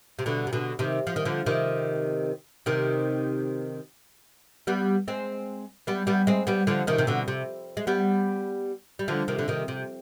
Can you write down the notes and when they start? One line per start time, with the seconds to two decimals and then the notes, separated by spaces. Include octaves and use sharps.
0.19 C3
0.26 B2 D3
0.47 C3
0.53 B2 D3
0.79 C3 D#3
1.07 F3
1.16 D#3
1.25 D3 F3
1.46 C3 D#3
2.66 C3 D#3
4.67 G3 B3
5.08 G#3 C4
5.87 G3 B3
6.07 G3 B3
6.27 G#3 C4
6.47 G3 B3
6.67 D3 F3
6.87 C3 D#3
6.98 C3
7.07 B2 D3
7.28 C3
7.77 G#3
7.87 G3 B3
8.99 G3
9.08 D3 F3
9.28 C3 D#3
9.38 D3
9.48 C3 D#3
9.68 C3